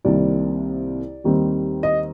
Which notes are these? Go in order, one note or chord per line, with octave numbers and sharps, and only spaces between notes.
C2 C3 D#3 G3 A#3 D5
D#2 D#3 G3 C4
D#5